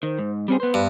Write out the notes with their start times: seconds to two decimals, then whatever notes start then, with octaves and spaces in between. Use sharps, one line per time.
0.03 D#3 C5
0.19 G#2
0.48 G3 C4 C#4 G#4
0.60 B3 B4 C5
0.74 G2